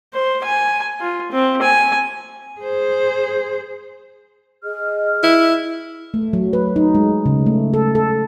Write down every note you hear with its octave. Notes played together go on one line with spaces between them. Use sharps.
C5
G#5
F4
C4
G#5
G#4 C5
G#4 D#5 F6
E4
A3
F#3
B4
D#4
G#3
C#3
A3
A4
A4